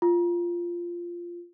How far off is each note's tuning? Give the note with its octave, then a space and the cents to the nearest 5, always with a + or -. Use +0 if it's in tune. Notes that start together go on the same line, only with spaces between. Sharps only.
F4 -10